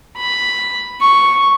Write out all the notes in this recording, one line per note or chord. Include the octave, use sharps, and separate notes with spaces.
B5
C#6